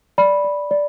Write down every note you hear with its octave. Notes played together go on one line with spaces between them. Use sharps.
D5 B5
D5
D5